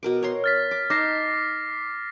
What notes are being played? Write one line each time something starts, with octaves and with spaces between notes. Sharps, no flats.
B2 A#4 D6
C#5 A#5 C6
F6 A6 B6
D6
D#4 A5 D6 A#6 C7